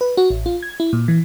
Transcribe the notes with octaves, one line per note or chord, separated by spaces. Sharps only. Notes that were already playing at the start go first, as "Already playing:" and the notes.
B4
F#4
A1
F4
G#6
E4
A#2
E3